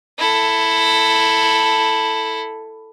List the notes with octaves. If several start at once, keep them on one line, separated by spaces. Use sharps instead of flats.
E4 A4